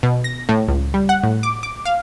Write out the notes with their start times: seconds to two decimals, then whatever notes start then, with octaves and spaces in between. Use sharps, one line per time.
0.03 B2
0.24 A#6
0.49 A2
0.68 C#2
0.94 G3
1.09 F#5
1.24 A2
1.43 D6
1.63 D6
1.85 F5